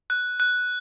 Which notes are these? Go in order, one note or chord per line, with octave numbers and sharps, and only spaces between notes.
F#6
F#6